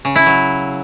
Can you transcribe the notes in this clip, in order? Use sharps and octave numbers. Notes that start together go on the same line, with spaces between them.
C#3
E4
F#3